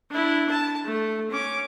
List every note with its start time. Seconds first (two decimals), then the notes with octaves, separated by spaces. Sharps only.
0.10 D4 E4
0.51 A5
0.84 A3
1.31 C#4 D6